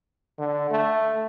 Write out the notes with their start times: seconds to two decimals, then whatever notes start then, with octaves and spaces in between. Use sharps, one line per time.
0.38 D3
0.71 A3